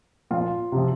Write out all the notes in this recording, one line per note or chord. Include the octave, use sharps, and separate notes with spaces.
A#2 F3 F4
C3 F3